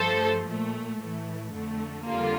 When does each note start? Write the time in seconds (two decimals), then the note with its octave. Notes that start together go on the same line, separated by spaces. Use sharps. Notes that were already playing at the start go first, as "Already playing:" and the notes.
Already playing: G2 F3 A3 A4 C5
0.45 A#2 A3
0.97 A2 E3 A3
1.51 F2 D3 A3
2.04 F2 D3 G3 A#3 F4 A4